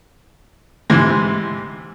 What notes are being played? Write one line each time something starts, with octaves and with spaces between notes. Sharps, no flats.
G#2 C3 E3